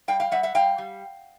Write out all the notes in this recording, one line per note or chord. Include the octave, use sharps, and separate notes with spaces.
G3 F5 G5
F5 G5
G3 E5 F#5
E5 F#5
G3 F5 G5
G3